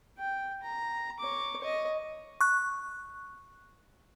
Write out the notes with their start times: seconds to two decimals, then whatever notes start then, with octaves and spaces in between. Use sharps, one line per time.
0.19 G5
0.63 A#5
1.19 C#5 D6
1.61 C#5 D#5
2.41 C#6 F#6